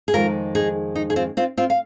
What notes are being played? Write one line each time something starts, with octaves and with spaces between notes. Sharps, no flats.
G#4
F2 D#3 G#3 F4 A#4
D#4 G#4
D#4
G#4
C4 F4
C4 F4
C4 F4
F5